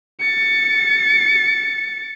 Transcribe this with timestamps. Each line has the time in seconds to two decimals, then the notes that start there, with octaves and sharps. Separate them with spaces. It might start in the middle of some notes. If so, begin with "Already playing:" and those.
0.21 A6 C#7